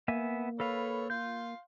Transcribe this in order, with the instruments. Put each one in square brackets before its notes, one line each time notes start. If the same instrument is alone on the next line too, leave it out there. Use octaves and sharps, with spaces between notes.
[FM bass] A#3 [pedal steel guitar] B3 E5 G#5
[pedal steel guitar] A4 B4 F5 [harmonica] C#5 B5
[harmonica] F5 C6 [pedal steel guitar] G6